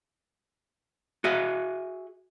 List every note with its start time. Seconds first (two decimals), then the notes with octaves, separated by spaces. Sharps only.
1.24 F#4 G#4 E5